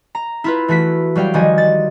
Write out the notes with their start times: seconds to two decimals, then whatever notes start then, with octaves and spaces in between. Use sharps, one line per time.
0.15 A#5
0.44 E4 F4 B4
0.68 E3 A3 F#4 B6
1.15 F#3 G3 F5 G5
1.34 D#3 F3 G3 F#4 D#5 G#5
1.58 A6